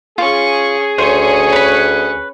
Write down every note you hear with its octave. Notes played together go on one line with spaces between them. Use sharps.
C#4 F4 G#4 C#6
D2 C#4 C5 C#5
B4 B5